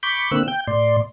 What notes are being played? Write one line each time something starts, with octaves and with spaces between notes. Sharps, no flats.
B5 C#6 D6 G6
D3 A#3 C4 E6 F#6
G5 G6
A2 D5 C6